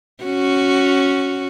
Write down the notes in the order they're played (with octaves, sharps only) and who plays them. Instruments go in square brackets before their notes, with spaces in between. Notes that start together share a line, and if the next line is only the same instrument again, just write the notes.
[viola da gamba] C#4 F#4